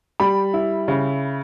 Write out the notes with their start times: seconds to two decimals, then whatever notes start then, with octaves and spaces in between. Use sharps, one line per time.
0.20 G3 B5
0.54 E4
0.88 C#3